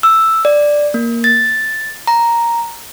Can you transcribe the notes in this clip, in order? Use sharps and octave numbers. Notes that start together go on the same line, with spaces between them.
E6
D5
A#3
A6
A#5